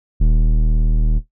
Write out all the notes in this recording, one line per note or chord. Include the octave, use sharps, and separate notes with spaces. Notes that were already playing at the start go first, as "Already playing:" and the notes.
D#1